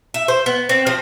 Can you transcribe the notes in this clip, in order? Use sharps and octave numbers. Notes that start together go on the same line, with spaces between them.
E5
C5
B3
C4
F3